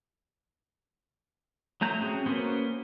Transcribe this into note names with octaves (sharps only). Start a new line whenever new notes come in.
F#3 A3 A#5 G6
C4 C#4 F#4 G#4
A#3 B3 C#4 F#4 C5